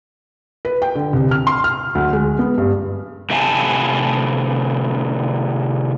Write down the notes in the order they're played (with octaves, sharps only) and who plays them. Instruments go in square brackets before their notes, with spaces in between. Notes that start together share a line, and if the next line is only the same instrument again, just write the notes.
[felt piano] B4
G5
D3
C2
F6
C6
F6
D2
G#3
B3
G2
[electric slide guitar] A2 C3 E5 F5 G#5 A5